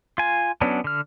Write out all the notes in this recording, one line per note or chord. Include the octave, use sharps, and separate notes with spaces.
F4 G#5
F#3 B3 C#4 D4
D3 F6